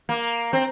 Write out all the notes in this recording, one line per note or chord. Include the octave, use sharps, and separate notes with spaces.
A#3
C4